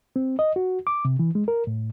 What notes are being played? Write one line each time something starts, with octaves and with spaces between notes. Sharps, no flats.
C4
D#5
F#4
D6
C3
E3
G#3
A#4
A2